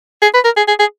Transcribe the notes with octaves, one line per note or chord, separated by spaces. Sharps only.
G#4
B4
A#4
G#4
G#4
G#4